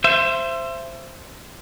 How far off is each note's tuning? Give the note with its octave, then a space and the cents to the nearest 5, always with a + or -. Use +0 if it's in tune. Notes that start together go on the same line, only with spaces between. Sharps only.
C5 +0 E5 +30